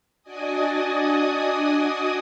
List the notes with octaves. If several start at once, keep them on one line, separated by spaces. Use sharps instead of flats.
D4 F#4 D5 D#5 G#5 D#6